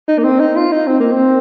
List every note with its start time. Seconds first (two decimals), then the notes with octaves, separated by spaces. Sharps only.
0.08 D#4
0.19 A#3
0.24 C4
0.40 D#4
0.56 F4
0.72 D#4
0.87 C4
1.00 A#3
1.12 C4